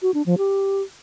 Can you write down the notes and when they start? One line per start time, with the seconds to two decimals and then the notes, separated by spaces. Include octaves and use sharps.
0.02 F#4
0.14 D4
0.26 F3
0.38 G4